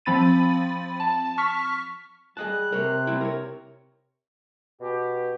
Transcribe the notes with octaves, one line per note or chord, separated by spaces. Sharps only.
F3 C4 B5 A6 D#7
A5
C#6 F6 B6
G3 G#4 D#5 A5 F#6
C3 A#4 C5 C#5
G3 C4 E4
A#4 C#5
B2 G4